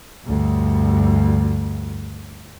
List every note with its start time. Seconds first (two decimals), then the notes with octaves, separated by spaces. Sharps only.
0.25 D2 G2